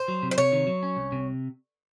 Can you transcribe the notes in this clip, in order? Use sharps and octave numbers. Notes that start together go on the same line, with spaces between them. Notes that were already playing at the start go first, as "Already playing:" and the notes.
Already playing: C5
F#3
C3
C5
C3 C#5
D#3
F#3
C#4
C2
C3